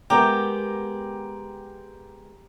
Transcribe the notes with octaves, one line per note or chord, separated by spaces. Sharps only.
G#3 B3 G4 A#4 G5 A#5